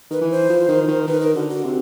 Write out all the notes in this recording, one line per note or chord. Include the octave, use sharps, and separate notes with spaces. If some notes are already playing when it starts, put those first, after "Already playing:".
D#3 B4
E3
C5
F3
D#3
D#3
D#3 B4
A#4
D3 F#4
F#4
C3